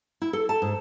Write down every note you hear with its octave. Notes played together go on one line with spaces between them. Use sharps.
E4
A4
A5
G#2